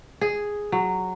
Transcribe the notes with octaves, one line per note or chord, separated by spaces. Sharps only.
G#4
F#3